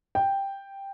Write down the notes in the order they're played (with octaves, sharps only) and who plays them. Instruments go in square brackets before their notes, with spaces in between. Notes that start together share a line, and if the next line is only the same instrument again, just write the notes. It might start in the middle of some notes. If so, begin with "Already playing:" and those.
[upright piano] G5